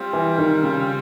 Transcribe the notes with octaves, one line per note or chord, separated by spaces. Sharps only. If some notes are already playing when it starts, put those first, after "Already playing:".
Already playing: G3 C4 F4
E3
D#3
C#3